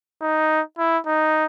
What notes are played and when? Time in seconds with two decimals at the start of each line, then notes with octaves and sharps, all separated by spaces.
0.21 D#4
0.78 E4
1.06 D#4